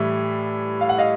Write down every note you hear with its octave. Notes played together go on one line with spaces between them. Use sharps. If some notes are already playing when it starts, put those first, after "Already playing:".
Already playing: A2 E3 G3 E5
F5
F#5
D#5 F5